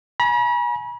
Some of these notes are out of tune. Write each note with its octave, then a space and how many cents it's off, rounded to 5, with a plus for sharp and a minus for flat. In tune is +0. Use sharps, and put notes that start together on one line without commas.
G#5 +20 B5 -45